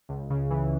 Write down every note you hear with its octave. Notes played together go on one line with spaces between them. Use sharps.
C#2
C#3
E3